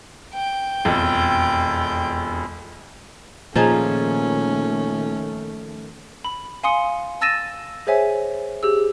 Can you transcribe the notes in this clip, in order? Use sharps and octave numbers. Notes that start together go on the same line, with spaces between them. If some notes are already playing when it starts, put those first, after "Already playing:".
G5
E1 F2
A#2 D#3 F3 A3 C#4 D#4 G#4
B5
F5 G#5 C6 D#6 C#7
A5 E6 A6 A#6 D#7 E7
G#4 C5 C#5 E5 G#5
G4 G#4 E6